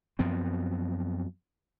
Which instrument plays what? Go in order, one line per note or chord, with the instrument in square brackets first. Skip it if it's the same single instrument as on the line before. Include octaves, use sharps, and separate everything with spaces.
[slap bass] F#2 F3 B3 C4